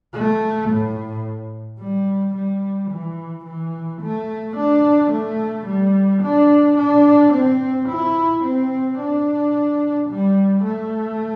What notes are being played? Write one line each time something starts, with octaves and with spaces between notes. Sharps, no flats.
A3
A2
G3
G3
E3
E3
A3
D4
A3
G3
D4
D4
C4
E4
C4
D4
G3
A3